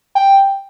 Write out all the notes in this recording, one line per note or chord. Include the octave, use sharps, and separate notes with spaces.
G5